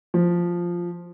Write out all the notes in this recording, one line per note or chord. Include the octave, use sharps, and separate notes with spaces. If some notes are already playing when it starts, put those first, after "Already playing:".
F3